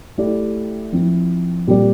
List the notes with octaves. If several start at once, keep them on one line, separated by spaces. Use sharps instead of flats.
A3 E4 G4 D5
F3 C4 E4
A#2 G3 C4 G4 D5